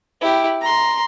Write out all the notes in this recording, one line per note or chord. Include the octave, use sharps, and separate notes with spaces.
E4 G4
A#5 C6